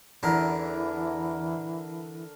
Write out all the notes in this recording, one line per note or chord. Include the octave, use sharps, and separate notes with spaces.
E2 D3 E3 E4 A#4